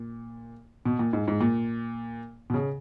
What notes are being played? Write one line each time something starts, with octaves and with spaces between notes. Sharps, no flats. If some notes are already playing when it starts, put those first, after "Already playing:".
Already playing: A#2
B2
A#2
G#2
G#2
A#2
B2
C#3